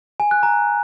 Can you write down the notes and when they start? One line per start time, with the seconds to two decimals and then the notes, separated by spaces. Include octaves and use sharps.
0.20 G#5
0.31 F#6
0.43 A#5